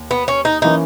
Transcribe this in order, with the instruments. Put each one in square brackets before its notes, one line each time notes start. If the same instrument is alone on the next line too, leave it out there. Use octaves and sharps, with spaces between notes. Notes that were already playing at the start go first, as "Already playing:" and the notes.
Already playing: [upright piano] D#2
[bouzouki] B3
C#4
D#4
[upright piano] E3 A#3 C#4 [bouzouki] D#4